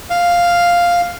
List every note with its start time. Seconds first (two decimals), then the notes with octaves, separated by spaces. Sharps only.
0.10 F5